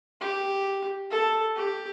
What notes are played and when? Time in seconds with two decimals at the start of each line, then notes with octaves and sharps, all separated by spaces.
0.21 G4
1.11 A4
1.56 G4